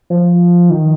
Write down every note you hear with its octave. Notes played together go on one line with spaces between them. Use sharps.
F3
D#3